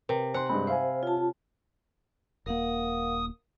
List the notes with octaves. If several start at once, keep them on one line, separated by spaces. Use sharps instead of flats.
C3 A#4 B4
C5 F#5 G#5 C6
G2 G#3 C4 B5
C5 E5 F5 G#5
F4 C#5 A5
D#1 A#3 A#4 F5 F#5 D#6